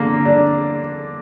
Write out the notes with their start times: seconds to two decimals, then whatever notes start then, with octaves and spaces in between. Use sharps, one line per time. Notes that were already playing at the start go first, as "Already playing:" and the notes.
Already playing: D3 A#3
0.25 D4